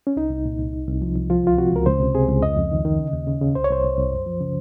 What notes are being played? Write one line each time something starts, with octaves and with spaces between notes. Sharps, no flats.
C#4
C2 D#4
C2
A#2
C2
C2
C2
F3
C2
F3 F4
C#2 F4
C3 F#4
C#2 A#4
C#2 C5
C3
C3 G#4
C#2
F2 D#5
F2
D#3
D#3
C#3
D#2
C#3
C#3
C2 C5
C#5
C2 C5
C2
C2
F#2
F3
C#3